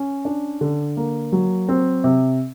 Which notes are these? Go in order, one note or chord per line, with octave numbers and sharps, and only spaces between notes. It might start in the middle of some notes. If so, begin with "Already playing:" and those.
Already playing: C#4
D4
D3
A#3
F#3
C4
C3